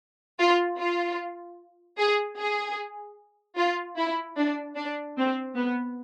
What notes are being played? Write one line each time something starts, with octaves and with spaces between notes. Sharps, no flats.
F4
F4
G#4
G#4
F4
E4
D4
D4
C4
B3